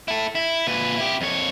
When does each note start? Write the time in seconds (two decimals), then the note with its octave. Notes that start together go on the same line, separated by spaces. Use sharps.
0.08 E4 A4
0.35 E4
0.67 A#2 B4
0.97 E4 G4
1.21 F2 C#5